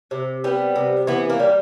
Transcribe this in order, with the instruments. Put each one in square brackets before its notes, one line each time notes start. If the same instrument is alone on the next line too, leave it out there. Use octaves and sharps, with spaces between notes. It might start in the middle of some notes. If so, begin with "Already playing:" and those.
[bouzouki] C3
G3 B3
C3
E3 B3
A#3
G3